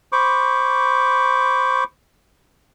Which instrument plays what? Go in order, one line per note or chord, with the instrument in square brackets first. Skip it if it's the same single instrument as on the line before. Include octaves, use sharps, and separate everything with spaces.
[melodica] C5 B5 C#6 D6